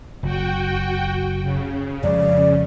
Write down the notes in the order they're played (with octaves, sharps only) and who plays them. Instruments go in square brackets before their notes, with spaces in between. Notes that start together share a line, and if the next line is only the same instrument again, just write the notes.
[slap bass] F#1 [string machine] F#4 G5
[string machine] C#3
[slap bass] F2 F3 G#3 [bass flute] D5